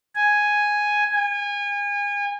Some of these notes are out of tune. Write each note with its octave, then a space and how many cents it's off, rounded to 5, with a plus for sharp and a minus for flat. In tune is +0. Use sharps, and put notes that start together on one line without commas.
G#5 +0
G#5 -30